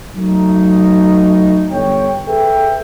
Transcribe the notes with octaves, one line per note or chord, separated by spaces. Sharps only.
F#3 A3 D#4
G1 C#5 G5
G#4 A4 B4 E5 G5